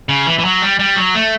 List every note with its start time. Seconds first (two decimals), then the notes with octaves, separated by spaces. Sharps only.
0.09 C#3
0.26 E3
0.39 E3
0.45 F#3
0.62 G3
0.79 G3
0.96 F#3
1.15 A3